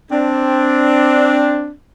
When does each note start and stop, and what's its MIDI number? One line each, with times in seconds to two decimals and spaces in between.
0.11 1.72 60
0.11 1.72 62